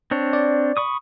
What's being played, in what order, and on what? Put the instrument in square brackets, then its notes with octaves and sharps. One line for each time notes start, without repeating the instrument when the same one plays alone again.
[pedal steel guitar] C4 D4 C#5
[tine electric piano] D5
[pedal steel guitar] B5 C#6 D#6